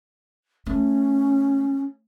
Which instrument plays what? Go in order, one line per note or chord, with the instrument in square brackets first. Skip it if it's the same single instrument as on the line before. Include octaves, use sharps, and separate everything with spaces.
[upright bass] A3 [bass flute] C#4